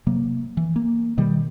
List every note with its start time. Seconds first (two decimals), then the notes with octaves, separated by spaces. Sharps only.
0.07 C3 F#3 A#3
0.57 E3
0.76 A#3
1.17 B2 D#3 G3